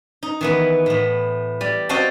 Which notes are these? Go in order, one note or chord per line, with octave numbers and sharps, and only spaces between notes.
D#4
D#3 E3 B3
A2 B3
G3
C4 F#4 D#5 F5 G5 A5